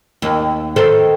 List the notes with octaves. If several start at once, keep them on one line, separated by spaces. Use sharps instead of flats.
D#2
D#3 A4 C5